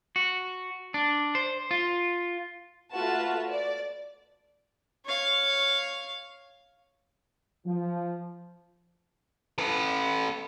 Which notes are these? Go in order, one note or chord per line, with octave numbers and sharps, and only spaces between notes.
F#4
D4
C5
F4
A3 F4 F#4 B4 A5
D5
C#5 F5
F3
A3 B4